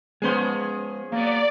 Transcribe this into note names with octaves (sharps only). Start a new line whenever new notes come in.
F3 G#3 B3 C#4 G#4 C5
F#3 A#3 B3 D5